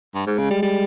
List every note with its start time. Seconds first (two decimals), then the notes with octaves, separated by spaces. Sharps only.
0.15 G2
0.27 G#2 G#3
0.38 C#3
0.51 G3
0.63 G3